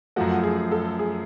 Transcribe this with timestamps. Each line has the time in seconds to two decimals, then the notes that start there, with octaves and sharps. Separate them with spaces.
0.16 F#2 F3 A3 F#4
0.44 G#4
0.72 A4
0.99 G#4